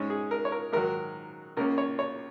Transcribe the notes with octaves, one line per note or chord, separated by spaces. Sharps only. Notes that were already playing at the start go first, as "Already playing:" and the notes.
Already playing: G#2 G#3 C#4
G#4
A#4
C#5
A#4
G#2 D#3 F#3 A#4
C#2 C#3 A#3 C#4 A#4
C#5
C#5